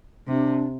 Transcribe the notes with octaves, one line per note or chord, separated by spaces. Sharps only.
C3 D4